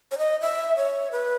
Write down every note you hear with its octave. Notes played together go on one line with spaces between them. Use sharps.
C#5
D#5
E5
C#5
B4